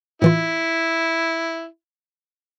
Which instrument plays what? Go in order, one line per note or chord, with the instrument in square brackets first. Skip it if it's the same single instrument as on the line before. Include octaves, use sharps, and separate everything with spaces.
[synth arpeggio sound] A2 E3 F4 [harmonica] E4